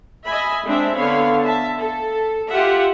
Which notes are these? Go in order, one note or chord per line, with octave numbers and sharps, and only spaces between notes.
D#5 E5 G#5 B5
G#3 C4 D4 E5
D3 B3 C#5 F5 B5
E5 A5
A4
F4 G4 E5 F#5